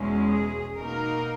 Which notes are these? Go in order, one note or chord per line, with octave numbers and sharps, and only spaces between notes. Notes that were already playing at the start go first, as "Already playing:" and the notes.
Already playing: E2 B2 G#3 C#4
G#4
B2 A#3 D#4 A#4